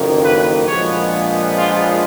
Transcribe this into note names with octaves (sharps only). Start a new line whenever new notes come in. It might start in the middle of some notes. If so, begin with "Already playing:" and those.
Already playing: F#1 F2 D#3 A#3
B4
A#1 A#2 F3 G#3 B3 C#5
F4